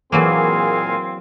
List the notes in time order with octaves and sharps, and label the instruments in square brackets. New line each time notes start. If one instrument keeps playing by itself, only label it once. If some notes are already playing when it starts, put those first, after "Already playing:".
[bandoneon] A#2 F5 G#5 [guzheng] E3 F#3 A#3 [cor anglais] C4 [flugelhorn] G#4